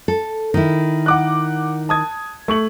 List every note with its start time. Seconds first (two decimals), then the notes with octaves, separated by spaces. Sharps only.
0.08 A4
0.54 D#3 E4
1.06 F#5 D6 F#6
1.89 A5 D#6 G#6
2.48 A3 C#6 F#7